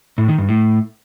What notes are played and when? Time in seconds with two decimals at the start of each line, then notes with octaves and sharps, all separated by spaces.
0.18 A2
0.28 D#3
0.38 G2
0.49 A2